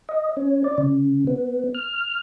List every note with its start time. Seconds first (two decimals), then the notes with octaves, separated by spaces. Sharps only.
0.09 D#5
0.37 C#4
0.64 D5
0.78 C#3
1.27 B3
1.74 F6